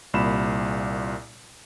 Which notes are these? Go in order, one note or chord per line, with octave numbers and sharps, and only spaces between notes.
C2 A#2 B5 E7